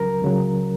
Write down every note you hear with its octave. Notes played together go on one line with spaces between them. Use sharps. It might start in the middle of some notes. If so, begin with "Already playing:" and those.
Already playing: C#2 C#3 F#3 A#4
C#2 C#3 F#3